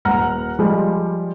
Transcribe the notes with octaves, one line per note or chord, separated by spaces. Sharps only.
D#1 F#5 A#5 F6
F3 G3 G#3